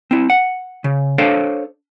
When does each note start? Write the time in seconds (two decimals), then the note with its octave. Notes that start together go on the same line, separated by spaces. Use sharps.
0.11 C4 E4
0.30 F#5
0.84 C#3
1.18 D4 A4 C5 C#5 F5